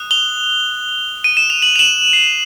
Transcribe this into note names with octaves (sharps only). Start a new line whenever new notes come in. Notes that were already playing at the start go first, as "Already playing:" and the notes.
Already playing: D#6 F#6
F7 G7
D#7
E7
F7
E7 F#7
F7
E7 F#7
C7